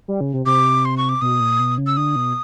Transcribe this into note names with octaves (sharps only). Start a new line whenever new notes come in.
G3
C#3
C3
C3 D6
C6
C#6
D6
B2 D#6
A#2
B2
C#3
E6
D3 D#6
B2